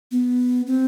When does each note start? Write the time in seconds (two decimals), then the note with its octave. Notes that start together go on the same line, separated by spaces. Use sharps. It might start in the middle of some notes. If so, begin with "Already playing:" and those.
0.11 B3
0.67 C4